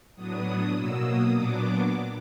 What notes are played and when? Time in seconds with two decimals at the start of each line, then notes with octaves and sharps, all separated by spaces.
0.15 A2 F#3 B3 D4 D#6
0.74 B2 F#3 A#3 E6
1.04 D#6
1.33 A#2 F#3 B3 D4 D6